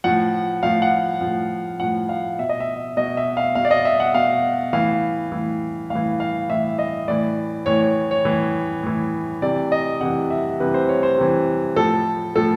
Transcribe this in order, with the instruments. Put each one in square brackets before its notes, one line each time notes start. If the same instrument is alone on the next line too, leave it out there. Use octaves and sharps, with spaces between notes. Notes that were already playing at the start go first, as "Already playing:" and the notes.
[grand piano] A2 F3 F#5
A2 F3 F5
F#5
F3
A2
A2 F3 F#5
F5
B2 E5
D#5
E5
B2 D#5
E5
F5
B2 F5
D5
D#5
E5
F#5
B2 F5
A2 E3 F5
A2 E3
A2 F5
E3
F5
A2 E3 E5
D#5
A2 E3 D5
A2 E3 C#5
C#5
C#5
A2 E3
A2 E3
C3 E3 D5
D#5
C3 E3 F#5
E5
C3 E3 B4
C5
C#5
C5
C3 E3
A2 F3 A4
A2 F3 A4